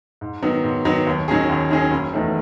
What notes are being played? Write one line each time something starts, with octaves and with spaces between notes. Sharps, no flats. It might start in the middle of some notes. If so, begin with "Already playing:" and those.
G#2
D#3 F#3 B3
G#2
D#3 F#3 B3
D#2
D#3 F#3 C#4 G#4
D#2
D#3 F#3 C#4 G#4
F#1
E2 D#3 A3